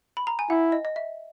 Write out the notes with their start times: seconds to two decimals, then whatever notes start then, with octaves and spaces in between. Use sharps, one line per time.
0.17 B5
0.27 A#5
0.39 G#5
0.50 E4 F#5
0.72 D#5
0.85 D#5
0.96 E5